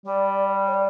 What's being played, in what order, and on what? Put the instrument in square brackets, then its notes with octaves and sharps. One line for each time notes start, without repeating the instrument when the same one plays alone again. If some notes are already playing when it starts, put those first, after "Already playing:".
[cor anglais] G3 [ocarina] D5
[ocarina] C#5
D5